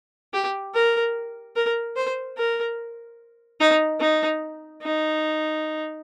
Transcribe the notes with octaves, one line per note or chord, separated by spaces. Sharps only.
G4
A#4
A#4
C5
A#4
D#4
D#4
D#4